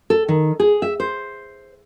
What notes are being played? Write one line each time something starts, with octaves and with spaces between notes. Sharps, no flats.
A4
D#3
G#4
E5
C5